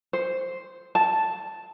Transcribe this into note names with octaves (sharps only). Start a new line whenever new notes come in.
C5
A5